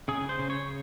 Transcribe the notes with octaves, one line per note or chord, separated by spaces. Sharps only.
C#3 G#4
C5
C#3
C#5